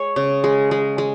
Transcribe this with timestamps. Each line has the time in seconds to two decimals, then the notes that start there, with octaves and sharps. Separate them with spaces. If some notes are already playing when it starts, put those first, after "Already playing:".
Already playing: G#3 C#5
0.16 C#3
0.44 G#3
0.71 G#3
0.98 G#3